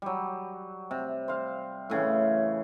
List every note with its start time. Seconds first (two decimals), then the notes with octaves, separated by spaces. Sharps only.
0.02 F#3 G3
0.91 C3
1.28 C5 F5
1.90 A2 C#3 E3